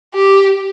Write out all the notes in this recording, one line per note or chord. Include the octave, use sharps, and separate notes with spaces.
G4